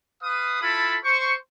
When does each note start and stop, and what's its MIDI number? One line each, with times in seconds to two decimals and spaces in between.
0.22 0.60 71
0.22 0.60 77
0.22 0.60 87
0.61 0.96 64
0.61 0.96 65
0.61 0.96 69
0.61 0.96 81
0.61 0.96 83
1.04 1.33 72
1.04 1.33 85